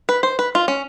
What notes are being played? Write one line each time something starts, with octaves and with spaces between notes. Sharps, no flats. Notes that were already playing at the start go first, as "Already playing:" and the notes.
B4
C5
B4
F4
C#4